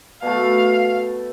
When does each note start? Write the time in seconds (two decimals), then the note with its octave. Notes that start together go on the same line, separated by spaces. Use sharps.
0.22 B2 A3 F5